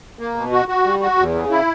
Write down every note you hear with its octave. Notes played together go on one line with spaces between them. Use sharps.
A#3
B2
F#4
F#4
G3
F#4
E2
C#3
E4